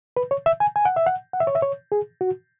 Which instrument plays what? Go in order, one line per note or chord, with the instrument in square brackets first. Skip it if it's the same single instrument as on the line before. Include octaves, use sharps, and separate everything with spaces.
[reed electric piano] B4
C#5
E5
G#5
G#5
F#5
E5
F#5
F#5
E5
C#5
E5
C#5
G#4
F#4